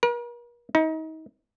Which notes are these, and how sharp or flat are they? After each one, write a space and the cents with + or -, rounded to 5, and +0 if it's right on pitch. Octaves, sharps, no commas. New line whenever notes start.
A#4 +45
D#4 +35